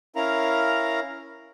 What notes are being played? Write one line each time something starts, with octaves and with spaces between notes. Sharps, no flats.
C#4 E4 A#4 F5 A#5